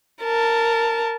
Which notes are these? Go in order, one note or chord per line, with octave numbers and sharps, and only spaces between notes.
A#4 A5